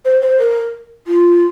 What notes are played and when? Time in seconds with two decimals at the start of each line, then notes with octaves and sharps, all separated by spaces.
0.05 C5
0.22 C5
0.39 A#4
1.07 F4